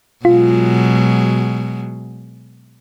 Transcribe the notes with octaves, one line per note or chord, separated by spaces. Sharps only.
B2 F#3 G#3 F4